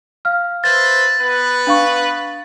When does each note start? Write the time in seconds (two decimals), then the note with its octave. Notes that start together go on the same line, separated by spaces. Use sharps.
0.25 F5 F6
0.64 B4 C5 E5 A6
1.20 B3 B4
1.67 D4 F5 C#6